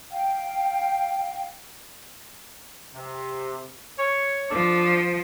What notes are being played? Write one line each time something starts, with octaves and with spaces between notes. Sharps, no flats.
F5 G5
C3
C#5
F3 D4 A4